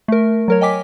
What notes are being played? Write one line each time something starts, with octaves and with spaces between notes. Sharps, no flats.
A3 A#4
F#3 A#4 C#5
D#5 G5 G#5 D6 B6